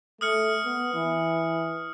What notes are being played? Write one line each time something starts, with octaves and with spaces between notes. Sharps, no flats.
A3 D#6 F6 C#7
B3
E3